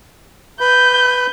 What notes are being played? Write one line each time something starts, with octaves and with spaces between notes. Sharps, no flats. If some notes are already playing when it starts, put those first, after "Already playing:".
B4 B5 G6